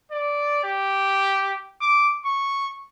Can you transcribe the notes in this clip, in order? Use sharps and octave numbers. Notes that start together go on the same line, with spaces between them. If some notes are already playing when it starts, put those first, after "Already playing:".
D5
G4
D6
C#6